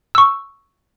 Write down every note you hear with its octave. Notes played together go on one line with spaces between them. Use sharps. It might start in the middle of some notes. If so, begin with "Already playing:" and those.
C#6 E6